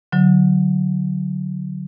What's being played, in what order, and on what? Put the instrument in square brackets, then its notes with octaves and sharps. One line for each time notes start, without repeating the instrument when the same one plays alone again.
[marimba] D3 F#3